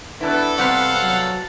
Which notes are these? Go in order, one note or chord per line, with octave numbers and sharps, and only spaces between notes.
B3 D4 E4 A4 B4
C3 G3 B3 C4 F5 F#5
F#3